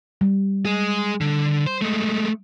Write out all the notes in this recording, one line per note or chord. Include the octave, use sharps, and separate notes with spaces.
G3
G#3 G#4
D3
C5
G#3 A3